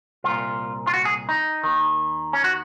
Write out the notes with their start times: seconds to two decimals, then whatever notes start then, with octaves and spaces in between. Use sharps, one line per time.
0.24 C2 A#2 F4
0.87 F4
0.94 F#4
1.05 G#4
1.29 D#4
1.64 D#2 D#3
2.33 C#4
2.44 F#4